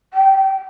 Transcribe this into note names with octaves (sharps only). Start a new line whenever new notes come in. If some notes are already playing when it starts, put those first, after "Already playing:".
G5